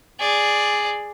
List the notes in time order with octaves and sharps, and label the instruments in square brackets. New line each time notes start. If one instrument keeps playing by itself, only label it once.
[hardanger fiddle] G#4 D5